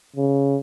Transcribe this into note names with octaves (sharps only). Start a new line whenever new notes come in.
C#3